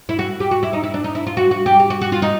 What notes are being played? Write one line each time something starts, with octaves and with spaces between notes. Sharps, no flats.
E4
F#4
G4
F#4
E4
D#4
E4
D4
D#4
E4
F4
F#4
F#4
G4
G4
F#4
F#4
F4
D#4